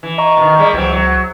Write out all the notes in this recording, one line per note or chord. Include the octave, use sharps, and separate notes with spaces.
E3
D#5 A#5 C#6
B2 D#3
G3 G#3 A#3
C#2 E3 F#3 C4
F#3